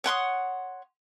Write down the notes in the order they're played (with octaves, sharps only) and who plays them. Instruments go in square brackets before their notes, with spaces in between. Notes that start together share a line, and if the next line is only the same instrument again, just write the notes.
[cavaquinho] C#5 F#5 C6 D#6